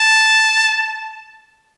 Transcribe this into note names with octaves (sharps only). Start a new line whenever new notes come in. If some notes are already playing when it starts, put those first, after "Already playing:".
Already playing: A5